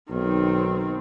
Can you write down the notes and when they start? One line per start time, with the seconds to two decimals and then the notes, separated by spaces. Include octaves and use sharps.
0.11 B1 D#3 C4